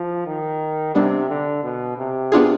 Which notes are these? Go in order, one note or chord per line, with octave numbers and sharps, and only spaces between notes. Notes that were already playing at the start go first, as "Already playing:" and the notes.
Already playing: F3
D#3
C3 G3 B3 D4
D3
B2
C3
B3 D4 F4 G#4